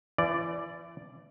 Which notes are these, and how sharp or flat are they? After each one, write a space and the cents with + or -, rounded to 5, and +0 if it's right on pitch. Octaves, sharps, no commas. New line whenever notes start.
E3 +35 D5 +0